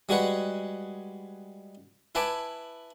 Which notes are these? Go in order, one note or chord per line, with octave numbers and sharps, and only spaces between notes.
G3 G#3 F#4 G#4 B4 F#5
E4 B4 G#5 A5 B5 D6